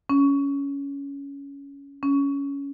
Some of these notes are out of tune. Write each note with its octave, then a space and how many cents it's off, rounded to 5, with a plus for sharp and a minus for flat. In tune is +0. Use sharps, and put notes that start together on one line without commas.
C#4 +15
C#4 +15